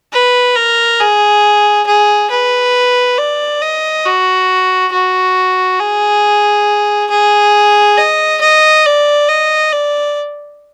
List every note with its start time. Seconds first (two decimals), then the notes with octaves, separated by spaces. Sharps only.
0.13 B4
0.56 A#4
1.00 G#4
1.87 G#4
2.30 B4
3.18 D5
3.62 D#5
4.06 F#4
4.93 F#4
5.80 G#4
7.11 G#4
7.98 D#5
8.41 D#5
8.86 D5
9.29 D#5
9.73 D5